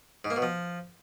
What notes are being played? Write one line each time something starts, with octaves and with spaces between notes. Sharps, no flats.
G#2
A#3
B2
F3